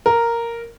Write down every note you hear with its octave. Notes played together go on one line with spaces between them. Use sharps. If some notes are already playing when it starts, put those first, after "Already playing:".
A#4